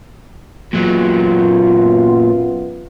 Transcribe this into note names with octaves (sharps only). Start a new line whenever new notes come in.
F#2 A#2 F#3 B3 F4